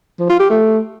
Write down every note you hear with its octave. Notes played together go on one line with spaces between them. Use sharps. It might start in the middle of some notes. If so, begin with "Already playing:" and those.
F3
F4
G4
A3